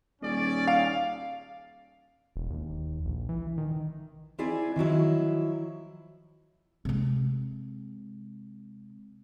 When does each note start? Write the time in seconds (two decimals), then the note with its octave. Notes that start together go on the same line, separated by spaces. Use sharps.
0.22 D#1 C#4 G#4 D5
0.68 F5
2.36 E1
2.50 D#2
3.05 A#1
3.29 E3
3.58 D#3
4.39 C4 E4 G#4 D5 G#5
4.76 D#3 F3 F#3 E4
6.85 C3 G#3